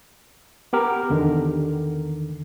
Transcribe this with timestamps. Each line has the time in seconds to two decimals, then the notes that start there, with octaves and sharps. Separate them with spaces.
0.73 B3 G4 A#4
1.10 E2 D3 D#3